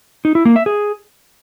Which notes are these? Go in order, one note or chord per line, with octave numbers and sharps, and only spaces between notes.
D#4
E4
A#3
E5
G#4